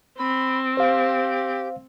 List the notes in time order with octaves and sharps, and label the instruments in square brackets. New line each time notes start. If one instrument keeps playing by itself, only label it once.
[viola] C4 [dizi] B5
[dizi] G4 [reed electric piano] C5 F5